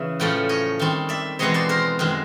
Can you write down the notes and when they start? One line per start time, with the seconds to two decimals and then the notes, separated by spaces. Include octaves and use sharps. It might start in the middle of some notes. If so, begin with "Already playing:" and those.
Already playing: C#3 E3 E5
0.20 A2 F3 A3 C#4
0.49 C#5 D#5
0.79 D#3 G3 C4
1.09 D5 E5
1.39 E2 B2 G#3 C4 C#5 D#5
1.54 C5 D5
1.69 A#4 C5
1.99 F#2 D#3 G#3 C4